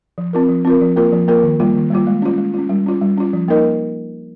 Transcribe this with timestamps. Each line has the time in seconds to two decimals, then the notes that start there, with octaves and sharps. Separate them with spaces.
0.18 F3
0.33 C4 F4 A#4
0.49 F3
0.65 C4 F4 A#4
0.81 F3
0.96 A#3 F4 A#4
1.12 F3
1.28 A#3 F4 A#4
1.43 D#3
1.60 G3 A#3 F4
1.76 D#3
1.90 G3 A#3 F4
2.07 G#3
2.22 C#4 F4
2.38 G#3
2.54 C#4 F4
2.69 G3
2.86 C#4 F4
3.01 G3
3.18 C#4 F4
3.33 F3
3.48 A#3 D#4 A#4 D#5